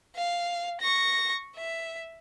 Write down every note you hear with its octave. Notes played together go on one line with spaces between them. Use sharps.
F5
C#6 A#6
E5